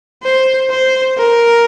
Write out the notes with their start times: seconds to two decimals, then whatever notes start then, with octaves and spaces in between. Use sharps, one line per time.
0.23 C5
0.70 C5
1.18 A#4